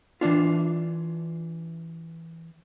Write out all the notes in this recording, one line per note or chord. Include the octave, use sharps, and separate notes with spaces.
E3 C#4 D4 F4